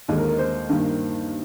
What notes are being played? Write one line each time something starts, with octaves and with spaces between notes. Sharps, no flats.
D#2 D3 G#3 D#5
A#4
A#4
C5
G2 D#3 A#3